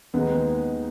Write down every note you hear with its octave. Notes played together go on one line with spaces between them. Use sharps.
D#2 D#3 G#3 B3 D#4 G#4